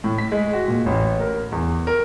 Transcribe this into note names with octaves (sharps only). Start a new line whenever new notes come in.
A2
B6
G#3
F#4
A#2
A1
A#4
E2
A#4